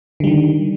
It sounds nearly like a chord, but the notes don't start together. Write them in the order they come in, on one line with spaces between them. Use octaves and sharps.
D3 G3 D#3